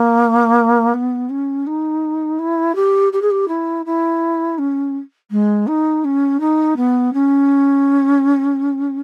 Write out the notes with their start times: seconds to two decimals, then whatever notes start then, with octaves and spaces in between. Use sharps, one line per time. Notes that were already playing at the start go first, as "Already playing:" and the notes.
Already playing: A#3
0.94 B3
1.29 C#4
1.66 D#4
2.39 E4
2.75 G4
3.12 G4
3.22 G#4
3.30 G4
3.48 E4
3.85 E4
4.58 C#4
5.31 G#3
5.67 D#4
6.04 C#4
6.40 D#4
6.76 B3
7.13 C#4